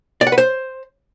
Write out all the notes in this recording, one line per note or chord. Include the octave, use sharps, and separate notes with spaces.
D5
F#5
B4
C5